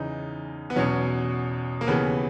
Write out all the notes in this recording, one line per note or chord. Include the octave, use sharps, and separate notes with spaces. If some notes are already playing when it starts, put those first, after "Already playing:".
Already playing: E2 C#3 E3 D#4
B3
E2 B2 F#3 C#4
A#3
D#2 C#3 E3 B3